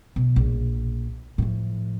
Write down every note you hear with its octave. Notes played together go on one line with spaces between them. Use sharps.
B2
A#1
A2 F3